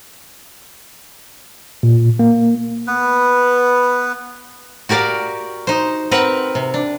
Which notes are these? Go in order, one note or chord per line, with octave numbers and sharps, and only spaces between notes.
A#2
A#3
B3 B4
F#4 G4 A#4 D5 F5
D#4 C5
C4 A#4 B4 F#5
C3
D4